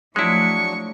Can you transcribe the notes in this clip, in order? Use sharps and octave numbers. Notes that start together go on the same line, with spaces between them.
F3 F#3 G#3 A3 D4 E4 C#6